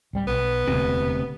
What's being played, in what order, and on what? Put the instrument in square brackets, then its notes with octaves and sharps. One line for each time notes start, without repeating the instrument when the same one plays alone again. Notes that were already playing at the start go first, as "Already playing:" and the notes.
[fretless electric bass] D1 G3
[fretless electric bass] B1 [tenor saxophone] B3
[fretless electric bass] E1 [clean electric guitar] D2 C3